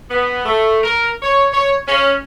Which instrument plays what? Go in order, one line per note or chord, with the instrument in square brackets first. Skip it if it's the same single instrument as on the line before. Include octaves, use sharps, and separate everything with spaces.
[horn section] B3
A3
A#4
C#5
C#5
C#4